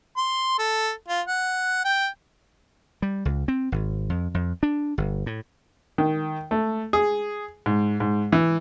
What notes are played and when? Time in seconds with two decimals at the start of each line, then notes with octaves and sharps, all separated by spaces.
0.17 C6
0.59 A4
1.08 F4
1.28 F#5
1.85 G5
3.02 G3
3.25 C#2
3.48 C4
3.72 G#1
4.10 F2
4.34 F2
4.63 D4
4.98 G1
5.26 A2
5.98 D#3
6.51 A3
6.93 G#4
7.66 G#2
8.00 G#2
8.32 E3